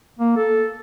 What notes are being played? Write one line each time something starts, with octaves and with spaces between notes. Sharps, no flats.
A#3
A4